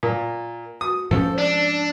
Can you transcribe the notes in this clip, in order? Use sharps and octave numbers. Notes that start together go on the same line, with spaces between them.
A#2
F#4 D#6
G#2 F3 C#4 A4 C5
D4 D5